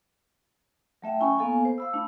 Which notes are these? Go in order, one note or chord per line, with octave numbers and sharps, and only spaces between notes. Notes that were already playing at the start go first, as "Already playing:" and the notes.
F#3 A3 E5 G5
C#4 E4 G#5 B5 C#6
A#3 B3 A4 F5 G#5
C5
F5 B5 E6
A3 D4 E4